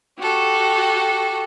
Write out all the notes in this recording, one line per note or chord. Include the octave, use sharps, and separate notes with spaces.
F#4 G4 A4